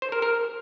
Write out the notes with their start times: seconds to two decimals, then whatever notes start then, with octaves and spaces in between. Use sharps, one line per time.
0.02 C5
0.12 A#4
0.22 A#4